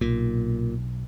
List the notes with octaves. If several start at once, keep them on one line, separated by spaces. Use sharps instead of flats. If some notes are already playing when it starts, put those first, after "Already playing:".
B1 A#2